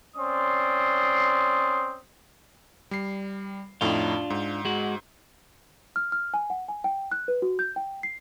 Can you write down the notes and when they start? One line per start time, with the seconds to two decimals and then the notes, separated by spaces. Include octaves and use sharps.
0.15 C4 C#4 D5 C6 D#6
2.91 G3 C7
3.81 F2 A2 D4 D#4 F4
4.30 G#2
4.65 G#3 F#4
5.96 F6
6.12 F6
6.34 G#5
6.50 F#5
6.69 G#5
6.84 G5
7.12 F#6
7.28 B4
7.42 F#4
7.59 G6
7.76 G5
8.03 C7